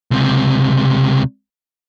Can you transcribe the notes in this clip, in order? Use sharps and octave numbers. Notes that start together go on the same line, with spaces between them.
C#2 C3